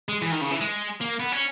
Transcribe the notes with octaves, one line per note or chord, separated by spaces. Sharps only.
G#3
E3
D#3
C#3
E3
G#3
A#3
B3
C#4